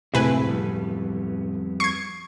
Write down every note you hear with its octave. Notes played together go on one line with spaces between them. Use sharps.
D1 C3 G#3 A3 C4 E4 B4 G#5
F2 G3 B3
C#6 G#6 C7